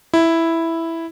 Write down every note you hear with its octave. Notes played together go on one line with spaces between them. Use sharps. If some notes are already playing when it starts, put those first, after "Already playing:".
E4